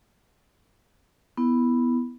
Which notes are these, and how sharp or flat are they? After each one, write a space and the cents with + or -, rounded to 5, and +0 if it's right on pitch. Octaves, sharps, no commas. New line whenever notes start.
B3 +0 E4 +0